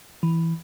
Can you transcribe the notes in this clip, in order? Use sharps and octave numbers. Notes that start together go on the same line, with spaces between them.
E3